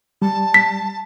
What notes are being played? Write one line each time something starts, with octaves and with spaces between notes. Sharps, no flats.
G3 A5
B6